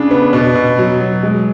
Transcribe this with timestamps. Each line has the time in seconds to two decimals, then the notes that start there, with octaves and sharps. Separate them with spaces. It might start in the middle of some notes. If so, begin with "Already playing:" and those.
Already playing: C#3 D4
0.11 B3
0.33 B2
0.55 B2
0.78 F#3
1.01 F#3
1.23 G#3